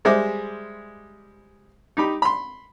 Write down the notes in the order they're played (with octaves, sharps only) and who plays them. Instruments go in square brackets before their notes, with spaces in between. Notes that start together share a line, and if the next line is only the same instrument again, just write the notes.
[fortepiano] G3 G#3 C5 E5 G#5 D6
D#4 G4 B5
B5 C6